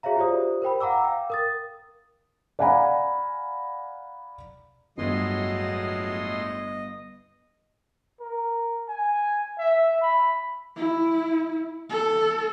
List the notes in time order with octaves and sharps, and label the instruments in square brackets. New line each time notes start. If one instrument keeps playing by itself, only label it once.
[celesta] F#4 G#4 C#5 E5 F5 A#5
F4 G4 C5 D5 D#6
A#4 C5 G5 B5
F5 F#5 A#5 D6 E6
F5 G5
A#4 D#6 A6
[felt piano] D5 F5 F#5 G#5 A#5 B5
[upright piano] G1 [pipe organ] A2 G#3 C6 [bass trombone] F#3 [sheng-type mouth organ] D#5
[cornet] A#4
G#5
E5
B5
[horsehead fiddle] E4
A4